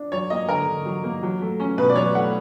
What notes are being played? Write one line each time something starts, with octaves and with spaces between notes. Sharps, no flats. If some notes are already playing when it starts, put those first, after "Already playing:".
Already playing: D4
F#3 C#5
A#3 D#5
D3 A#4
D3
F#3
A#3
F#3
A3
C#4
B2 B4
D5
F#3 C#5
A3 F#5